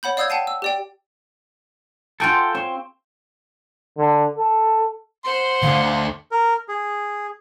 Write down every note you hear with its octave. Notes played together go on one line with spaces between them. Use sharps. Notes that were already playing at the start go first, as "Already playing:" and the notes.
C#5 F#5 B5 G6
D5 F5 D#6 E6 G6 G#6
F#5 G5 A5 C7 D#7
E6
G4 D5 G5
F4 F#4 G#4 A4 G5
C4 C#5
D3
A4
C5 F#5 C6
D2 D3 F5
A#4
G#4